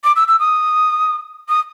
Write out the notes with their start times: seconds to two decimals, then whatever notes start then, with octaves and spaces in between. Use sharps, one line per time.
0.04 D6
0.16 E6
0.28 E6
0.40 D#6
1.49 D#6